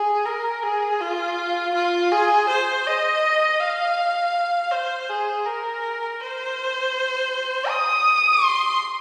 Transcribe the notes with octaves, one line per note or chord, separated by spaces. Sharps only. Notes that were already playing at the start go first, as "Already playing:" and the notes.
Already playing: G#4
A#4
G#4
F4
F4
G#4
C5
D#5
F5
C5
G#4
A#4
C5
D#6
C6